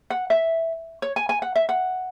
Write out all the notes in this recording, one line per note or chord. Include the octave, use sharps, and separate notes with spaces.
F#5
E5
C#5
G#5
G#5
F#5
E5
F#5